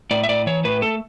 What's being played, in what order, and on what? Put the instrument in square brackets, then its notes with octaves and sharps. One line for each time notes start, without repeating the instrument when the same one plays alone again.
[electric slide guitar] A2 D5
E5
A2 D5
E3 C#5
A2 B4
A3 A4